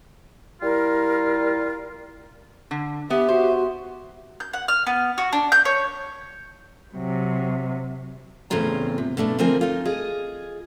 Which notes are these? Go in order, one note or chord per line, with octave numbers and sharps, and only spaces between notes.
G3 E4 F4 A#4
D3
B3 G4 E5
F#4 C5
G6
F#5
F6
B3
F#4
D4
G6
C#5
C3 F#3
E2 A2 C#3 C4 F4 A#5
C3
B2 A3 D4 F4
D3 F3 C4 F4 A#4 G#5
D#4 F4
F4 G#4 D#5